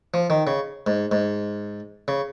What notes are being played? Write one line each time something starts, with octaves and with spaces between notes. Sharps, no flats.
F3
D#3
C#3
G#2
G#2
C#3